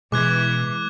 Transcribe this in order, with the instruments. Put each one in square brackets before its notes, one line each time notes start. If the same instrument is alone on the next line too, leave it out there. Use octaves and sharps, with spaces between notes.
[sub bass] B2 [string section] E3 [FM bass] G#3 [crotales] D6 F#6 G#6